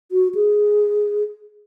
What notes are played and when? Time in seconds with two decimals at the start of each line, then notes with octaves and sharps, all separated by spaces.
0.12 F#4
0.35 G#4